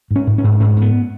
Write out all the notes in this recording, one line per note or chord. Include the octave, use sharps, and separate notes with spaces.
G#2
C#4
G#2
C#4
G#2
G#2 C#4
G#2
B3